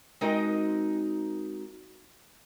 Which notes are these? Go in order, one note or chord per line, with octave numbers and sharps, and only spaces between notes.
G#3 C4 D#4 F#4 A#4 D#5